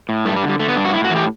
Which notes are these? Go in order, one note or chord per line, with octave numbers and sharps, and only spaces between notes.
A2
G2 A3
G3
D3
G3
D3 A3
B3
G2 D4
F#4
A2 E4
F#4
E3
G4